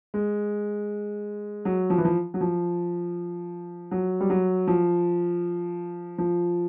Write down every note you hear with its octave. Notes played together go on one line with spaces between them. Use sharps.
G#3
F#3
F3
E3
F3
F#3
F3
F#3
G3
F#3
F3
F3